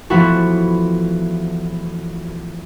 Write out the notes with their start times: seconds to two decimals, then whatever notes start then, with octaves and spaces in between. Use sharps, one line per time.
0.10 E3 F3 A3 B3 E4 F#4